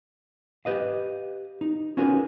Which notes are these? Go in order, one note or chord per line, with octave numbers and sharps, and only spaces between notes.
G4 B4 D#5 F5
D#4
C#4 F4 F#4 G#4 A#4 B4